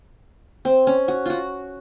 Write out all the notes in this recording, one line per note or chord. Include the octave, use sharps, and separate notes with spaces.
C4
C#4
F#4
F4 F#4